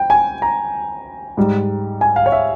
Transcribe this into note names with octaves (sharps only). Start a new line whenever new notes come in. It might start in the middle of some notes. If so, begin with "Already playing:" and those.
Already playing: G5
G#5
A#5
G#2 G3
G#5
F5
C#5
E5